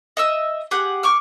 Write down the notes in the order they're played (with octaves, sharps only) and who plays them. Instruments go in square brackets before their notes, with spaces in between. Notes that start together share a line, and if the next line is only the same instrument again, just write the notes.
[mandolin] D#5 E5 E6
G4 G#4 F#5
C#6 D6 F6